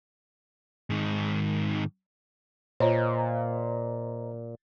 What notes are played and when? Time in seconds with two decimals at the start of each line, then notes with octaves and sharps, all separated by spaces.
0.90 G#2 D#3
2.80 A#2 F4 C5 C#5 D#5 A#5